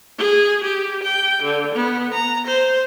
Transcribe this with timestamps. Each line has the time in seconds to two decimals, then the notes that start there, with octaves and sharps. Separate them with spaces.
0.18 G#4
0.64 G4
1.03 G5
1.43 D3
1.75 B3
2.14 A#5
2.47 C5